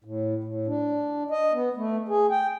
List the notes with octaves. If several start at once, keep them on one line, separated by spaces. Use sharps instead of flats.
A2
A2
D4
D#5
B3
A3
G#4
G5